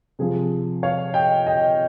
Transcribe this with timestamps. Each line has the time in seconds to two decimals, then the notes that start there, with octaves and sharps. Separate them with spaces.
0.19 C3 F3 G#4
0.83 C#5 F5
1.14 D#5 G5
1.46 D#5 G5